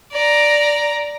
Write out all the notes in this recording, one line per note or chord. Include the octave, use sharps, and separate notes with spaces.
D5 A#5